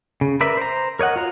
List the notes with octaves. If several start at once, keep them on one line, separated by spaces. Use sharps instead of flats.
C#3
A#4 B4 D5 E5 B5
C5 A#5
A#4 C#5 D#5 F#5
F4 F#4 A#5